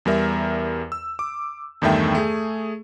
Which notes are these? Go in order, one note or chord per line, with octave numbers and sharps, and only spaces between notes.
E2 G3 A#4 E5
E6
D6
E2 G2 D#3 A3 E5 G5
A3 G#4